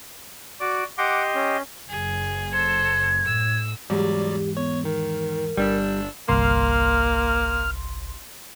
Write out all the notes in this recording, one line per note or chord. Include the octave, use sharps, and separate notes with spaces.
F#4 D5 D6
G4 D#5 F#5 C6 D6
C#4
F#1 G#4
A4 C5 G#6
A2 E6
E2 G#2 F#3 G3 G4 D5
B3 C#5
D#3 A#4
G1 G3 D4 E6
G1 C2 A#3 C6 F6